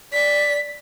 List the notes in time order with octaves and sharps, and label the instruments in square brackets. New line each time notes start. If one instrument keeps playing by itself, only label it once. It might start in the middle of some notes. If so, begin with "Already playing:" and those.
[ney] D5 [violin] B6